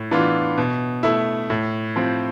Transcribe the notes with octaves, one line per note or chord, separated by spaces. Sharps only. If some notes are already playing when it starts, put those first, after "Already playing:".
Already playing: A2
E3 B3 D4 F4
B2
A3 E4
A2
F3 C4